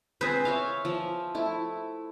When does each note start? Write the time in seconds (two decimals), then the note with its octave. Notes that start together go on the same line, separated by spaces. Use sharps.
0.21 C4 F4 G#4 B4 C5
0.45 C#5 E5 F5
0.85 F3 E5
1.35 A3 E4